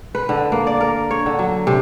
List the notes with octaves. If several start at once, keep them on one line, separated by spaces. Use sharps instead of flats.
B4
D3
A#3
D5
A#4
C#5
D3
F#3
C3